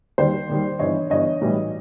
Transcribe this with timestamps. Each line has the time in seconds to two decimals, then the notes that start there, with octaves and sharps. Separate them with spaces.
0.18 D#2 D#3 G3 C5 D5
0.49 D#2 D#3 G3
0.79 G1 G2 E3 C#5 D#5
1.10 G1 G2 E3 C#5 D#5
1.41 B1 A2 E3 G3